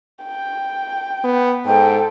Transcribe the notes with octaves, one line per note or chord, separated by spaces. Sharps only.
G5
B3
G#2 A4 G5